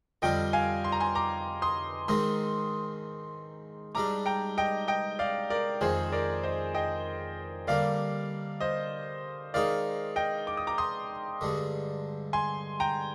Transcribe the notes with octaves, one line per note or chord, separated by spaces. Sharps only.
F2 D3 G3 C4 F4 D#5 G5
F5 G#5
C6
A#5
G#5 C6
A#5 D6
C6 D#6
G#2 D#3 G#3 C4 C6 D#6
G#2 G3 D4 A#5 D6
G5 A#5
D#5 G5
D#5 G5
D5 F5
A#4 D5
F2 D#3 G#3 G#4 C5
A#4 D5
C5 D#5
D#5 G5
D3 G3 A#3 D5 F5
C5 D#5
D#3 G#3 D#4 D5 F5
D#5 G5
D6
D#6
A#5 D6
C6 D#6
G2 D3 G#3
G#5 C6
G5 A#5